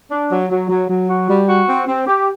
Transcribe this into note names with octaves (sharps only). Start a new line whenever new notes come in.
D4
F#3
F#3
F#3
F#3
F#4
G3
F#4
C4
C4
G4